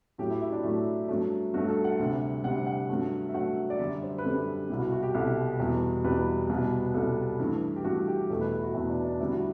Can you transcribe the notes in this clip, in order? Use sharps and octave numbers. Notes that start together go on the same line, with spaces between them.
A2 F#3 A3 G4
E4
E4
D4
A2 F#3 A3 E4
G2 F#3 A3
G2 F#3 A3 F#4
A4
F#5
D2 C3 G3
D2 C3 G3 F#5
F#5
G2 F#3 A3
E5
G2 F#3 A3 F#5
D5
F#2 D3 G3 E5
C5
B4
F#2 D3 G3 A4
C2 B2 G3 E4
F#4
F#4
G4
C2 B2 G3 A4
E2 B2 G3
E2 B2 G3 B4
C2 B2 G3
C2 B2 G3 A4
G2 E3 A3
G4
G2 E3 A3 F#4
G4
E2 B2 A3 A4
B4
E4
F#4
E2 B2 A3 E4
D4
D4
D2 D3 G3 E4
F#4